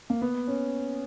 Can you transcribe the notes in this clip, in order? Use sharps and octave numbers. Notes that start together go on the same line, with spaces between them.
A#3
B3
C#4